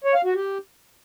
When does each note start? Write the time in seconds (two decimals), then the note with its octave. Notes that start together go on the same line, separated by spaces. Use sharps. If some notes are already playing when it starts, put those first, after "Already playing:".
0.04 C#5
0.14 F5
0.25 F#4
0.35 G4